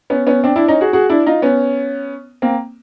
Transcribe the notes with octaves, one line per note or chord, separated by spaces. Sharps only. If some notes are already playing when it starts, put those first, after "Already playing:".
B3 C#4
B3 C#4
C4 D4
D4 E4
C#4 D#4
F#4 G#4
F#4 G#4
D4 E4
D#4 F4
B3 C#4
A#3 C4